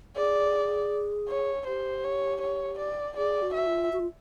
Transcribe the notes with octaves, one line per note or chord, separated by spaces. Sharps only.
G#4 D5
C#5
G4 C5
C#5
C#5
D5
G#4 D5
F#4
E5
F4
F#4
F4